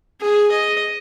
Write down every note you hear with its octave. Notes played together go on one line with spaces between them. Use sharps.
G#4
D#5